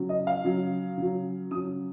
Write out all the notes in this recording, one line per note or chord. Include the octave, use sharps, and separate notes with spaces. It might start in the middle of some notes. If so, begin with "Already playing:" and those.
Already playing: C#3 F#3
D#5
F5
C#3 F#3
C#3 F#3
C#3 F#3 D#6